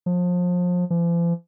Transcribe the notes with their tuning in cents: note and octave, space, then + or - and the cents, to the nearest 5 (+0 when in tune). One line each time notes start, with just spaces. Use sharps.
F3 +30
F3 -45